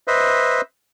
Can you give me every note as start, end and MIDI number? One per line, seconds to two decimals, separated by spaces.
0.08 0.61 71
0.08 0.61 72
0.08 0.61 75
0.08 0.61 76